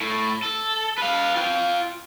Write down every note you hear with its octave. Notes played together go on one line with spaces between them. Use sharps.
A2
A4
B4 F5
F4 G5